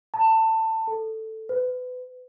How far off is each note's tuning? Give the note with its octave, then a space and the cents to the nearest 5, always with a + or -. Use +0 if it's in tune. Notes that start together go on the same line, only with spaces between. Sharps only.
A5 +20
A4 +5
B4 +30